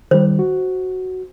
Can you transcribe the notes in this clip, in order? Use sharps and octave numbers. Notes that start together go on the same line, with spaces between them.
D#3 G3 C5
F#4